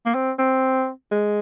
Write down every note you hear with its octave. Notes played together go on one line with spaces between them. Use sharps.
A#3
C4
C4
G#3